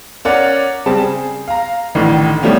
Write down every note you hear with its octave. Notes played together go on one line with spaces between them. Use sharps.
C#4 A#4 D5 F#5
C#3 G3 C4 A5
G#4
F5 A#5
A1 A2 D3 D#3
B2 D3 F3 G3 A3 C#4